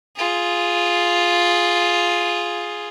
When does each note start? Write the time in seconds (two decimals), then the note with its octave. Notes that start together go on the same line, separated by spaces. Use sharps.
0.17 F4 G#4